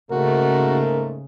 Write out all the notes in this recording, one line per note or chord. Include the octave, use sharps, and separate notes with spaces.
G#2 C#3 A3 A#3 F#4 A#4